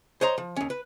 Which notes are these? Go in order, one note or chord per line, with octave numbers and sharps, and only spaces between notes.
C5 C#5 D#5 A#5 C6
F3
D#2 C#4
B4